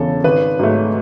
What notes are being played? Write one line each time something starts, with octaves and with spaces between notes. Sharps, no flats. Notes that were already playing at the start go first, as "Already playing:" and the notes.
Already playing: E1 E2 C#3 A4
G#1 B4
G#2 F#3 A3